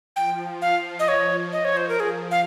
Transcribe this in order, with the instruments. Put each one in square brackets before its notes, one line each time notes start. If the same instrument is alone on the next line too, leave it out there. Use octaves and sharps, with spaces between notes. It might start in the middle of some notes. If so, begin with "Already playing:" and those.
[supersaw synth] F3 [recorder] G5
[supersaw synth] F3 [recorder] F5
[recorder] D#5
C#5
D#5
C#5
C5
A#4
G#4
F5